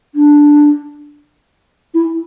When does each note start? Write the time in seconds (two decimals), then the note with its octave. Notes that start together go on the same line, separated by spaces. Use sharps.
0.14 D4
1.94 E4